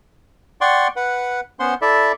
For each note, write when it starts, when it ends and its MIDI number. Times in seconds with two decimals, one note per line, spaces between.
0.61 0.88 74
0.61 0.88 78
0.61 0.88 79
0.61 0.88 84
0.61 0.88 85
0.96 1.40 71
0.96 1.40 78
1.60 1.74 59
1.60 1.74 61
1.60 1.74 72
1.60 1.74 78
1.60 1.74 84
1.82 2.12 64
1.82 2.12 69
1.82 2.12 74
1.82 2.12 76